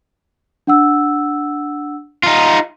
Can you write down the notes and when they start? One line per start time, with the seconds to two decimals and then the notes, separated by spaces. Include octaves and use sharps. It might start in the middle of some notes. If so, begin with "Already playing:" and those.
0.67 D4 F#5 E6
2.23 D#4 F4